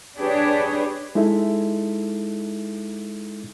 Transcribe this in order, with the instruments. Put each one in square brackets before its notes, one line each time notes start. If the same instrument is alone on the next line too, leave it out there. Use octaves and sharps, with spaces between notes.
[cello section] D4 G4 G#4 B4 C#5
[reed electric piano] G#3 D#4 E4 A4 E5